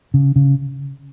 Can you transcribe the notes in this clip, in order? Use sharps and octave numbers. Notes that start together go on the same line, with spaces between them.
C#3
C#3